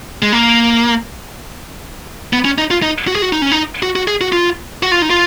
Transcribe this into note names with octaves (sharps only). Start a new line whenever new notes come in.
G#3
A#3
B3
C#4
D#4
F4
D#4
F#4
G#4
F#4
D#4
C#4
D#4
F#4
F#4
G#4
F#4
F4
F#4
F4
D#4
F4